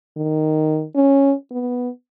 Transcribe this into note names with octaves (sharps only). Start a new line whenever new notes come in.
D#3
C#4
B3